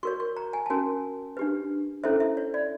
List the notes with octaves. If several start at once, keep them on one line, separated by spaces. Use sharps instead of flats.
F#4 A#4 C#5 C#6
C#6
A#5
G#5
A5
C#4 F#4 A#4 G#5
D4 G4 B4
C#4 E4 A4 C5 E5
E5
C#5
D5